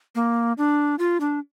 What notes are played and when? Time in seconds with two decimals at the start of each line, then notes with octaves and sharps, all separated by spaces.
0.15 A#3
0.58 D4
0.99 F4
1.20 D4